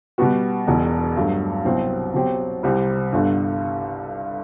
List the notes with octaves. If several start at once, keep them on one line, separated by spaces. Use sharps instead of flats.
B2 G3 B3 F#4
E1 E2 B2
G2 F#3 A3
C2 B2 F#3 C4
B2 F#3 C4 G4
C2 C3 G3 C4
G1 G2 D3